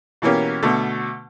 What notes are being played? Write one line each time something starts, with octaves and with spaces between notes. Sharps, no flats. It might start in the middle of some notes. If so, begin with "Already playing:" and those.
B2 E3 A#3 C#4 G4
B2 D3 A3